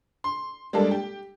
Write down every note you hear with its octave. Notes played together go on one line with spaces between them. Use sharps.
C6
G3 G#3 A#3 D4 A4
G4